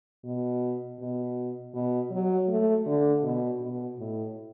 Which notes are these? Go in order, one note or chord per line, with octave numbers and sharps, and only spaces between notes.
B2
B2
B2
F#3
A3
D3
B2
B2
A2